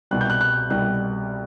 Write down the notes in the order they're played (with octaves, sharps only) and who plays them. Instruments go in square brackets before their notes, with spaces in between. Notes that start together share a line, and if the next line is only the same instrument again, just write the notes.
[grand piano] C2 B2 G3 F#6
G6
F#6
F#6
C2 B2 G3 F#6